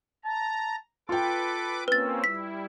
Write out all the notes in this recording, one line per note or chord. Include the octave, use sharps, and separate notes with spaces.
A5 A#5
F4 A4 B4 G5 D6
A#3 C4 C#4 B4 E6 A6
G3 E4 B6